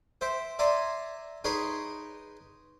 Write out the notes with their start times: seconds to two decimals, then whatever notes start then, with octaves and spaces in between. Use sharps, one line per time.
0.21 C5 E5 G5
0.59 D5 E5 G#5 A#5 C6
1.44 D#4 G#4 B4 C#5 G5 C6